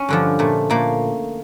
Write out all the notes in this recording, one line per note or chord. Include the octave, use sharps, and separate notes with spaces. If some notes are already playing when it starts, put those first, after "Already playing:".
Already playing: C#4
G2 D3 F3
A#2 A3
A#2 A3 A#3